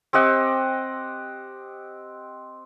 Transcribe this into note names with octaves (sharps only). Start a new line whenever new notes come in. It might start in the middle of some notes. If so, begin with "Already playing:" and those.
C4 G4 D#5 F#5